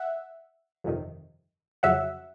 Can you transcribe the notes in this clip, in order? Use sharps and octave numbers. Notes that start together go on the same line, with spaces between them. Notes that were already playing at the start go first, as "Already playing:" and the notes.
Already playing: E5 F#5
G1 F2 C3 D#3
F2 C#3 F#3 E5 F#5